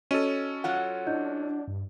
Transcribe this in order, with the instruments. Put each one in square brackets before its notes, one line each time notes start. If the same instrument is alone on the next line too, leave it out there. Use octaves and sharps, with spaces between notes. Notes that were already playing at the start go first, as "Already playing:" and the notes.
[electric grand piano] C#4 A4 [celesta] F#4 D#5 D#7
[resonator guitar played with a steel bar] F#3 F4 F#5
[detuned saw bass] D4 [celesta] E4 D#5 G6
[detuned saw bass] G2